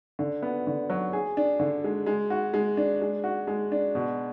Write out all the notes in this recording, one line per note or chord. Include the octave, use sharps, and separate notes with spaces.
D3
B3
D3
F#3
G#4
D4
D3
G#3
G#3
F#4
G#3
D4
G#3
F#4
G#3
D4
B2